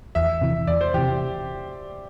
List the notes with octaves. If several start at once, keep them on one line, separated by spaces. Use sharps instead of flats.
E2 E5
C3 E3
E2 D5
C5
C3 E3 G4